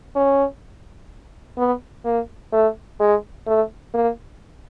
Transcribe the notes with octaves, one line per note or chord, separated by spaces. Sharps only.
C#4
B3
A#3
A3
G#3
A3
A#3